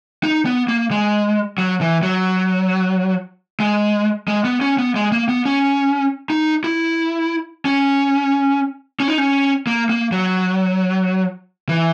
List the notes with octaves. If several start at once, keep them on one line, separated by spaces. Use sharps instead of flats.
D#4
B3
A#3
G#3
F#3
E3
F#3
G#3
G#3
B3
C#4
B3
G#3
A#3
B3
C#4
D#4
E4
C#4
C#4
D#4
C#4
A#3
A#3
F#3
E3